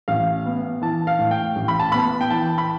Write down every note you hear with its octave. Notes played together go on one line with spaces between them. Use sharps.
A1 F5
B3
E3 A5
F5
A2
G5
A1
B5
A5
B3 B5
G5
E3 A5
B5